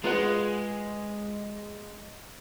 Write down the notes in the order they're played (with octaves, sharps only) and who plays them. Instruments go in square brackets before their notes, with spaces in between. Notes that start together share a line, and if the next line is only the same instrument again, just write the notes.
[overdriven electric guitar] G#3 [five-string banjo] F4 B4 F#5